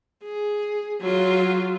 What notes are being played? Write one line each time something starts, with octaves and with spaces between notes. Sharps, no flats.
G#4
F#3 F4